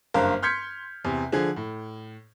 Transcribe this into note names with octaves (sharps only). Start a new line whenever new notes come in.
F#1 G2 A#4 C5 F5 F6
C6 F6 G6 G#6 B6 C#7
E2 C3
D3 F3 G#4
A2